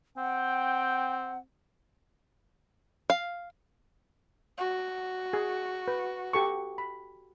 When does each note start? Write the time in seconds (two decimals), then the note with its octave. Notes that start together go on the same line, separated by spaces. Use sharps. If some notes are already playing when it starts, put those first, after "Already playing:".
0.17 C4 F#5 G5
3.10 F5
4.58 F#4
5.33 G#4
5.88 B4
6.33 G4 A4 C#6
6.78 B5